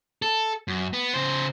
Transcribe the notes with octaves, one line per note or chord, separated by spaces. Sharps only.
A4
F#2
B3
C#3 C5